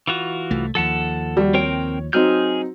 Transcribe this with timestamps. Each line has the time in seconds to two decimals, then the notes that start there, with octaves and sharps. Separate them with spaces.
0.07 E3 F4 F#4
0.51 C2 A3
0.75 D#2 F3 A4 F#5 A5
1.37 G3 F#4
1.54 C4 A#4 C#5 G5
2.13 F#3 C4 D#4 G#4 F6 G6